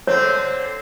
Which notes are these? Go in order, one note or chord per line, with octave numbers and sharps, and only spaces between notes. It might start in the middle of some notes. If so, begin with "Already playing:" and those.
D3 C4 C#5